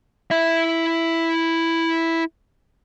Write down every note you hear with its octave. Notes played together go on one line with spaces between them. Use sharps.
E4 E5